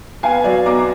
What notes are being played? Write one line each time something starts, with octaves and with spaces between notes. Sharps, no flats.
B3 F5 G#5
F#3 D5 F5
B1 A#5 D6
D6